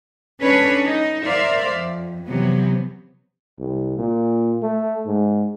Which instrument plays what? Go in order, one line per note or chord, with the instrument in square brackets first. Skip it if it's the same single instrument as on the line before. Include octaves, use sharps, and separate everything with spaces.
[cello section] C#4 D4 A4 B4 C#5
D#4
A#4 C5 D5 E5 F5
F2
C3 E3 F#3 B3
[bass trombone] C2
A#2
A3
G#2